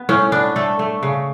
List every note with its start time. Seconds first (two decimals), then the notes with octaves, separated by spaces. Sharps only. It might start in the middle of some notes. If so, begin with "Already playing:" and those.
Already playing: B3
0.09 A2 C#4
0.32 B3 D4
0.56 A3 A4
0.79 A3
1.03 C#3